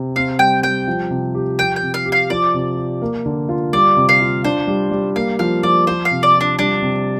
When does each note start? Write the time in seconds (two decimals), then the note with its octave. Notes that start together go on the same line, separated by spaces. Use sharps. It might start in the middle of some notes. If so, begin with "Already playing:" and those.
Already playing: C3
0.16 C4 F5
0.39 G3 G5
0.63 G3 G5
0.88 F3
1.10 C3
1.35 G4
1.59 F3 G5
1.76 G5
1.83 C3
1.94 F5
2.06 G4
2.12 F5
2.30 F3 D5
2.54 C3
2.78 G4
3.02 A#3
3.26 D3
3.49 F4
3.73 G3 D5
3.96 C3
4.09 F5
4.20 F4
4.44 D4 C5
4.67 G3
4.91 G3
5.16 A#3 F5
5.39 F3 F5
5.63 F3 D5
5.87 F3 C5
6.05 F5
6.11 C3
6.23 D5
6.35 F4
6.41 D4
6.59 G3 D4
6.82 C3